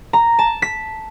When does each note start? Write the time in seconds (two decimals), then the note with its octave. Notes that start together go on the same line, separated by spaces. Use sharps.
0.13 A#5
0.39 A5
0.62 B6